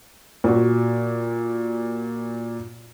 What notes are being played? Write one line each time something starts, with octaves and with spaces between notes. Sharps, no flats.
A#2 F#4